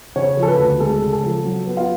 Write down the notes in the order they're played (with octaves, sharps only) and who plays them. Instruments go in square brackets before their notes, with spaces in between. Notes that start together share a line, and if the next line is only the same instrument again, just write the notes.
[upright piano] C#3 C#5
F3
A4
B4
D2
G#3 A4
C#3
A4
F3
F#3
B3
F4